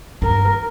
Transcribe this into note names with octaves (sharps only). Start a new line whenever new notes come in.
G2 A#4